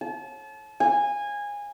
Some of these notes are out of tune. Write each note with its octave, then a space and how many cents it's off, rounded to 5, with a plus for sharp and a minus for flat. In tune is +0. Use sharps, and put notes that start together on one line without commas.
A5 -35
G#5 -20